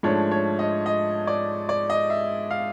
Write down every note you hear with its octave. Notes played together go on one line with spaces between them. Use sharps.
G#2 F3 A3 D4 C#5
C#5
D#5
D#5
D5
D5
D#5
E5
F5